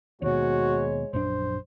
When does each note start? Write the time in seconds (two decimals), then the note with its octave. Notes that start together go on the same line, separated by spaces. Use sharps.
0.22 D#2 G#2 B2 G#3 F#4 C#5
1.13 A#1 F#2 D4 C5